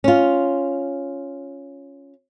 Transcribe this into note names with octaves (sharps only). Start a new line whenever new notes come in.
C#4 F4